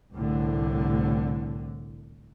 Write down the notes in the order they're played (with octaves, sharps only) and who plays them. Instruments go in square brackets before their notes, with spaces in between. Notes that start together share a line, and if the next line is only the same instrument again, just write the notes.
[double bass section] C2 A2 D3